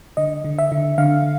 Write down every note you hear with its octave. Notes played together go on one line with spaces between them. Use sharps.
D3 D#5
D3
E5
D3
D3 F5